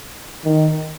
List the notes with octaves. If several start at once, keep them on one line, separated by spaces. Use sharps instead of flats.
D#3